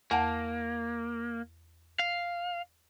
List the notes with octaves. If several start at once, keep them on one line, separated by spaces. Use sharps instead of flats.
E2 A#3 F#5 A5
F5